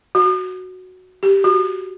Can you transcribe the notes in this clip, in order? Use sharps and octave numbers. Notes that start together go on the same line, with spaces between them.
F#4
G4
F#4